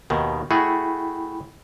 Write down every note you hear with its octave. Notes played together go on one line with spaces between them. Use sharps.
D#2 B2 D#3
A3 E4 F#4 G#4 G5 B5